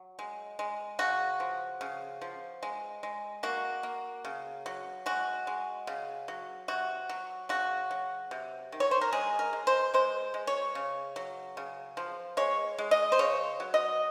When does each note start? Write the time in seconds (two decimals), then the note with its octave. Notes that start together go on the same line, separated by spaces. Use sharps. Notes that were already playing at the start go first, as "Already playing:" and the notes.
Already playing: F#3
0.19 G#3
0.59 G#3
0.99 C#3 F#4
1.40 F3
1.81 C#3
2.21 F3
2.63 G#3
3.03 G#3
3.43 A#3 F#4
3.83 A#3
4.25 C#3
4.66 F#3
5.06 G#3 F#4
5.47 G#3
5.87 C#3
6.28 F#3
6.68 C3 F#4
7.09 F#3
7.49 C#3 F#4
7.91 F#3
8.31 C3
8.72 D#3
8.80 C#5
8.91 C5
9.01 A#4
9.13 G#3 G#4
9.39 A#4
9.53 G#3
9.67 C5
9.94 G#3 C5
10.34 G#3
10.47 C#5
10.75 C#3
11.16 F#3
11.57 C#3
11.97 F3
12.37 G#3 C#5
12.78 G#3
12.91 D#5
13.12 C5
13.19 C#3 C#5
13.60 F#3
13.74 D#5